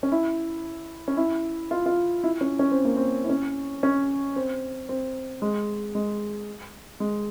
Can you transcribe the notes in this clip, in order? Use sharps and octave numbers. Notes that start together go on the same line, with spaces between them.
C#4
E4
C#4
E4
F4
F4
E4
C#4
C#4
C4
A#3
C4
E4
C#4
C#4
C4
C4
G#3
G#3
G#3